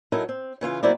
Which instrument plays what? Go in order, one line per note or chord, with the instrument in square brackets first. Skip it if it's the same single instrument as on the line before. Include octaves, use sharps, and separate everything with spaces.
[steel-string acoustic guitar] F#3 D#4 E4 A4 A#4
C4
C#3 E3 F4 F5
F#3 A#3 C4 E4 D5